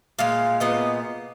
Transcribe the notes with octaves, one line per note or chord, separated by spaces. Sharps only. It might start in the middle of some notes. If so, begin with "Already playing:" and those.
A#2 G#3 F5
A#2 G#3 B3 D#5